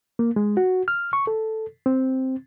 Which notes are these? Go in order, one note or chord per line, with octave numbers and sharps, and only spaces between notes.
A#3
G#3
F#4
F6
C#6
A4
C4